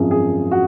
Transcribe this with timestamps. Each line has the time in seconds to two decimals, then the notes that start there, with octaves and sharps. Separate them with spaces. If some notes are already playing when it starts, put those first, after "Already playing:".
Already playing: G#1 F#2 F3 G#4
0.11 G#4
0.51 F#4